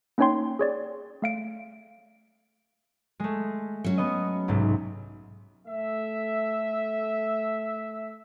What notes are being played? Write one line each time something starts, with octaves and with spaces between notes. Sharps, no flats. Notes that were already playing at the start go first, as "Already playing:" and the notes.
A#3 C#4 D#4 C#5 G5 C6
G#4 C#5 D5
A3 F5 D7
G#3 A3
F#3 C#4
B3 D#5
B1 G#2 C3
A3 E5